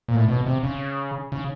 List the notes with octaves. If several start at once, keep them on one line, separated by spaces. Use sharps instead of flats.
A#2
A2
B2
C3
C#3
C#3